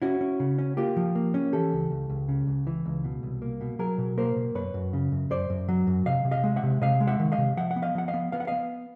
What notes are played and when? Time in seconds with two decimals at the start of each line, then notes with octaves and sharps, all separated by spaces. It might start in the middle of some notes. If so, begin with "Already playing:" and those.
0.02 C#4 E4 F#4
0.21 C#4
0.40 C#3
0.58 C#4
0.77 A#3 F4 G4
0.97 F3
1.15 A#3
1.34 C#4
1.53 E3 G4 A4
1.72 C#2
1.91 C#2
2.10 C#2
2.28 C#3
2.47 C#2
2.67 E3
2.86 C#2
3.04 B2
3.23 C2
3.42 A#3
3.61 B2
3.79 F#3 G#4 A#4
3.98 B2
4.18 A#3 A#4 C5
4.36 B2
4.55 F#2 B4 C#5
4.74 F#2
4.93 C#3
5.12 F#2
5.30 F#2 C5 D5
5.50 F#2
5.68 F#3
5.87 F#2
6.06 C3 D#5 F5
6.25 C3
6.31 D#5 F5
6.44 G#3
6.56 E5 F#5
6.63 C3
6.81 C3 D#5 F5
7.00 G#3
7.07 E5 F#5
7.20 D#3
7.32 D#5 F5
7.38 C3
7.57 F3 E5 F#5
7.71 F#5
7.76 B3
7.82 D#5 F5
7.95 F3 F#5
8.08 D#5 F5
8.14 B3
8.32 B3 F5
8.40 F#5
8.47 B3 D#5 F5